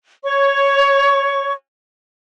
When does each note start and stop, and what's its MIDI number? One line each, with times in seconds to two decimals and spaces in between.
0.23 1.52 73
0.23 1.52 85